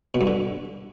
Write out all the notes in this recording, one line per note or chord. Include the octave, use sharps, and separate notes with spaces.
B2
G2
D3